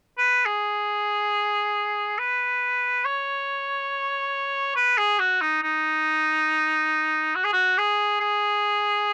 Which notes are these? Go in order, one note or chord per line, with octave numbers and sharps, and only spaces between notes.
B4
G#4
B4
C#5
B4
G#4
F#4
D#4
D#4
F#4
G#4
F#4
G#4
G#4